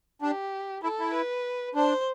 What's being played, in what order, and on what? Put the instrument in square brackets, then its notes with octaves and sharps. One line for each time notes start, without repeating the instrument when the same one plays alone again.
[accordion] D4 [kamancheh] G4
[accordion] E4 [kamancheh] A4
[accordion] E4
[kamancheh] B4
[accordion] D4 [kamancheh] C5